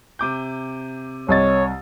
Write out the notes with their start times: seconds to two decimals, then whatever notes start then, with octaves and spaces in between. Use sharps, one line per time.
0.19 C3 D6 G6
1.29 C2 C#5 D#5 A6